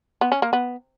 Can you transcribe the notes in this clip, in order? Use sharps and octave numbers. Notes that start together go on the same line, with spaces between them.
B3
C#4
A#3
B3